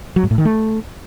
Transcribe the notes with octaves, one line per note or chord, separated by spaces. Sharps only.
F#3
G#2
A2
D#3
A3